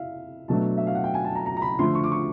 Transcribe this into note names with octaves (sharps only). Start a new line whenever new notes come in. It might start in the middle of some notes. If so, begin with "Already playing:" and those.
Already playing: E4 E5 F5
B2 F#3 A3 D4 A5
E5
F5
F#5
G5
G#5
A5
A#5
A#5
A#5
B5
D3 F3 A3 C6
C#6
D6
C#6